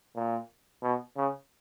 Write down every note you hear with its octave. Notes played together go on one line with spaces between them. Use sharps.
A#2
B2
C#3